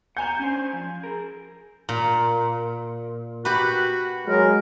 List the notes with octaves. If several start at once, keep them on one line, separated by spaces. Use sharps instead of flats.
F#5 G#5 A#5 G6
C#4 D4 C5
F3
G#4 A#4
A#2
F#4 G4 B4
F#3 G#3 A#4